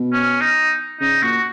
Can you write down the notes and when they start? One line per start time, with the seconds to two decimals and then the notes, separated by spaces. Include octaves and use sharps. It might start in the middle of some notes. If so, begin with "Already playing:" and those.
Already playing: B2
0.12 C#4
0.41 D#4
1.00 C#3 D#4
1.22 A#2 F#4